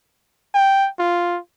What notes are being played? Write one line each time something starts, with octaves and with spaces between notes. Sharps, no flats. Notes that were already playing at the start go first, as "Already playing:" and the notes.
G5
F4